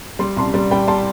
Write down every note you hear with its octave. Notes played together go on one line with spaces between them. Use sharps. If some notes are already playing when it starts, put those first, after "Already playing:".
G3 C6
C2 A5 C6
G3
G3 G5 B5
G3 A5 C6